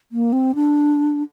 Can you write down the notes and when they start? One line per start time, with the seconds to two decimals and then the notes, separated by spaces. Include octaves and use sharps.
0.12 A#3
0.33 C4
0.55 D4